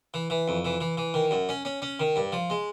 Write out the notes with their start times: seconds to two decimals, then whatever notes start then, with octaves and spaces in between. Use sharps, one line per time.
0.14 E3
0.30 E3
0.48 F2
0.65 E3
0.81 E3
0.97 E3
1.14 D#3
1.31 F#2
1.49 C#4
1.65 C#4
1.82 C#4
2.00 D#3
2.16 G2
2.32 F3
2.50 G#3